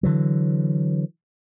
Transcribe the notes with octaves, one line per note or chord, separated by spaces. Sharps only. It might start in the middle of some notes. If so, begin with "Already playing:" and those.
D3 E3 F#3